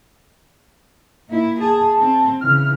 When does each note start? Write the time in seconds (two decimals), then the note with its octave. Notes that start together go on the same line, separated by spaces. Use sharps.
1.29 A#3 E4
1.60 G#4 A5
1.98 C4
2.41 C#3 E3 F6